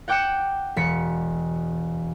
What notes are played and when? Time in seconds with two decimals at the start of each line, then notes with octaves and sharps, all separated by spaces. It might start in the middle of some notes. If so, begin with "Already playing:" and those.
0.08 F#5 G5 D6 F#6 C#7 E7
0.76 E1 B6 C#7